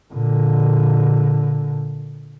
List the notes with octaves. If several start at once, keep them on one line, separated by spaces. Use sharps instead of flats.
A#2 D3